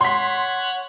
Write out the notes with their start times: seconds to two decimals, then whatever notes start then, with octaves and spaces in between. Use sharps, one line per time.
0.01 C#5 F#5 C6 B6